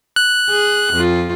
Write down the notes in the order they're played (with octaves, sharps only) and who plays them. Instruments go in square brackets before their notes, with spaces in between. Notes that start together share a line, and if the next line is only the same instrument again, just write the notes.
[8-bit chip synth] F#6
[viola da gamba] G#4
F2 F4